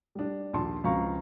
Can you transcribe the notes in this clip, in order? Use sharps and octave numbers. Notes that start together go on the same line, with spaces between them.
G3 D4
A#1 D#2 A5 C6
C#2 F3 C4 F5 A#5 C#6